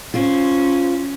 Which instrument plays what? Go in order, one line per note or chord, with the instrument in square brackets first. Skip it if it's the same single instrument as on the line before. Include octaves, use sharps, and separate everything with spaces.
[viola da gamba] C#4 [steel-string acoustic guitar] F4 C5